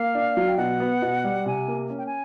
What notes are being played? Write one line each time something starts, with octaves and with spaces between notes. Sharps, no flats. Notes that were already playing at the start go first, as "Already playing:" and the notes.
Already playing: A#3 F5
D4
F#3
G5
B2 F#5
B3
B2
G3
C3 G#5
A#3
C#4
G5
G#5